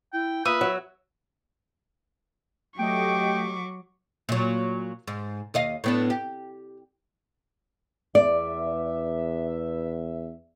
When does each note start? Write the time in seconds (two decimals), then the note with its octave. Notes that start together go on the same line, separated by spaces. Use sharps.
0.13 E4 G5
0.45 A#3 F4 B4 E5 D#6
0.61 F#3
2.79 F#3 A3 G4 D#5 G5 C#6 D6
4.29 A#2 F#3
5.08 G#2
5.54 D#2 D#5 F5
5.84 A2 B3 D4
6.10 G4
8.15 E2 D5 E5